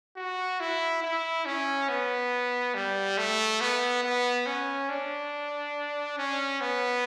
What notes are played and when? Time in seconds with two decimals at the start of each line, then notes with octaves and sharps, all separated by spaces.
0.17 F#4
0.60 E4
1.03 E4
1.46 C#4
1.89 B3
2.75 G3
3.18 A3
3.61 B3
4.03 B3
4.46 C#4
4.89 D4
6.18 C#4
6.61 B3